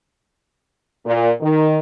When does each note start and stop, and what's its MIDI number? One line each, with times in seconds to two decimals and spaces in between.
1.04 1.27 46
1.40 1.77 51